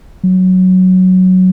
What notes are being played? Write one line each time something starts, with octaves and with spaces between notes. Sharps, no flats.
F#3